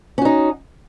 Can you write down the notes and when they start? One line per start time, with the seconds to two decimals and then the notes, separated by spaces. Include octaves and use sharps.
0.18 C#4
0.22 F#4
0.25 D#4